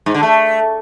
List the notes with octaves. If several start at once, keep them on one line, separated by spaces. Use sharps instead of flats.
G#2
D3
A3